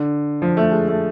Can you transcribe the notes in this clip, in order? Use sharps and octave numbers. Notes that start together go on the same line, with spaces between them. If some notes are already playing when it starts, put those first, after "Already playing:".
Already playing: D3
F3
A3
G#3
A3